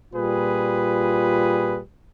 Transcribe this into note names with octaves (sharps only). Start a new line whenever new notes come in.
A#2 G3 F4 G#4 B4